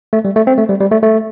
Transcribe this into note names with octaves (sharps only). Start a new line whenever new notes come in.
A3
G3
A3
C4
A3
G3
G3
A3
A3